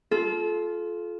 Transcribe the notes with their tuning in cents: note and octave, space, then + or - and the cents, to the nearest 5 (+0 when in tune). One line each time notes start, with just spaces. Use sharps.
F4 +0 A4 -35